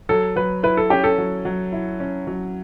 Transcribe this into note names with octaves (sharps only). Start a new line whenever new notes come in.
F#3 A4
F#3 B4
E4 B4
A4
C#4 G4
A4
F#3
F#3
E4
C#4
F#3